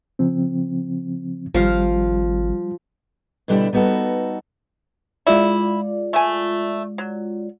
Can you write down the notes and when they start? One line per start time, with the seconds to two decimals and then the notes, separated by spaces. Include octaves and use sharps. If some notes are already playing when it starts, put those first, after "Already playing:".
0.19 C#3 F3 C4
1.54 G#1 F3 G3 F5
3.48 B2 D3 G3 D4 E4 G4
3.73 G3 B3 D#4 F#4 A4
5.27 G#3 E4 F4 D5
6.13 A3 G#5
6.98 F#3